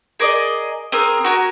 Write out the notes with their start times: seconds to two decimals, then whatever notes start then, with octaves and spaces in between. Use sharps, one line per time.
0.20 G#4 A#4 D5 D#5
0.92 C4 G#4 A#4 D#6
1.24 F#4 A#4 G#5